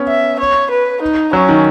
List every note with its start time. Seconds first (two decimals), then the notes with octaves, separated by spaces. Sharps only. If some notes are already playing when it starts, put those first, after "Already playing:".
Already playing: B3 C#4
0.08 E5
0.40 C#5
0.71 B4
1.02 D#4
1.33 F#3 C#4
1.49 D#3